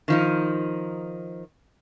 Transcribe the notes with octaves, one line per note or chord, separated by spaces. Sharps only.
D#3 F3 D#4